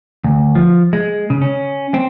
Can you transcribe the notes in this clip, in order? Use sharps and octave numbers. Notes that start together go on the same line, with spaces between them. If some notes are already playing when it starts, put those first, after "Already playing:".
D2
F3
G#3
C#3
C#4
C4